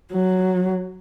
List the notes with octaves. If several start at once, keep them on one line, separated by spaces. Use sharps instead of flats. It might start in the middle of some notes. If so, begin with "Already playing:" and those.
F#3